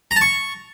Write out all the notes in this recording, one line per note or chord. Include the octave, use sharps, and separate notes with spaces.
A#5
A5
C#6